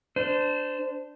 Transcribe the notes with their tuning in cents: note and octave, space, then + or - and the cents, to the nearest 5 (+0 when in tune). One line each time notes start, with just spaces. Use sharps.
D4 +0 C5 -20